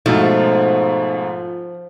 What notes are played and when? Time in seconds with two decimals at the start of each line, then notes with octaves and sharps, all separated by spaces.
0.06 G#2 B2 F3 A3 D#4